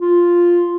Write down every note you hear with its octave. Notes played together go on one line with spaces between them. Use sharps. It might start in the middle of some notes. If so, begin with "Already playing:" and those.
F4